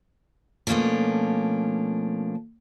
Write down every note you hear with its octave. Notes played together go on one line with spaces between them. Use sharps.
B2 F3 A3 A#3 C#4 D4